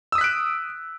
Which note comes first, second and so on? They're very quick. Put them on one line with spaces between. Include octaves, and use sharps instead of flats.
E6 D#6 B6 F#6 D7